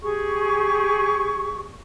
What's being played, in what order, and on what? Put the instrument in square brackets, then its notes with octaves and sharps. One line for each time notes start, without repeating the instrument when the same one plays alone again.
[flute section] G4 G#4 C#6